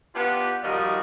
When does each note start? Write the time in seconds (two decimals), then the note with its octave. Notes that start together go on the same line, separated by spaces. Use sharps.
0.15 B3 D4 F4 G4
0.63 D#3 F3 G3 D#4 F4 F#4